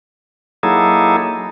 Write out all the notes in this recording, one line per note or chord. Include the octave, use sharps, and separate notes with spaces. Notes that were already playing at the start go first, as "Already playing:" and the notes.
F#3 A#3 D#4 E4 G#4 A4